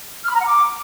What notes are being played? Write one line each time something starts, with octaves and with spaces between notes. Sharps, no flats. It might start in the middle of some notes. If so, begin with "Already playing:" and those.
F6
B5
A#5
F#5
D6